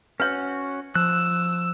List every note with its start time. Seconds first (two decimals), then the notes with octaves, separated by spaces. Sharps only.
0.20 C#4 F#4 B4 C#5
0.95 F3 E6 F#6